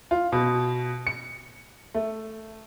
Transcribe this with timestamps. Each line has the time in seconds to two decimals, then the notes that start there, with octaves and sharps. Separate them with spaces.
0.11 F4
0.32 B2
1.07 C#7
1.95 A3